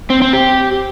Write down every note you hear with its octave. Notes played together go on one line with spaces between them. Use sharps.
C4
C4
G4